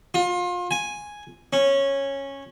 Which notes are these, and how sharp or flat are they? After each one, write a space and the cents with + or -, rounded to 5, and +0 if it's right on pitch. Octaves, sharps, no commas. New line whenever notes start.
F4 +30
G#5 +0
C#4 -10